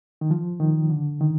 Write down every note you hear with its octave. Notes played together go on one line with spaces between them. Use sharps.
D#3
F3
D#3
D3
D#3